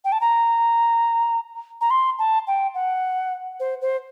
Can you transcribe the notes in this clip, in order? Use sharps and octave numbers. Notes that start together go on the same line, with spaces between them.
G5
A5
A#5
A#5
C6
A5
G5
F#5
C5
C5